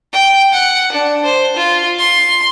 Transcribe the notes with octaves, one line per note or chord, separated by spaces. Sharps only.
G5
F#5
D4
C5
F4
C6